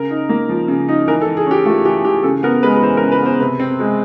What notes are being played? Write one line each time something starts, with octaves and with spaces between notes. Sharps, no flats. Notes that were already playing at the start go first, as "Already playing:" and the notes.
Already playing: C#3 A#4
D#4
A#3
F3
C#3
D#4
E3 A#4
A4
E3
G#4
C#4 G4
A3 F4
E3 G4
E3 G4
C#3 A4
B3 A#4
G#3 B4
B4
E3 C5
A#4
C#3
B4
B3 C5
C3 B4
C4
G#3